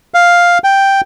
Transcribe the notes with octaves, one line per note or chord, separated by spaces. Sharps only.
F5
G5